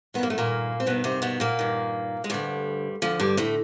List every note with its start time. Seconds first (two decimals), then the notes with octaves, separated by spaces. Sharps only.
0.14 D#3 B3
0.18 G2 A#3
0.30 A3
0.38 A#2 A#3
0.80 C4
0.86 G2 B2 D#3 B3
1.04 C3 C4
1.22 B2 B3
1.40 A#2 A#3
1.59 G2 D#3
2.24 G#3
2.30 D2 G2 D3 G3
3.02 D2 D3 F3
3.19 G2 G3
3.37 A2 A3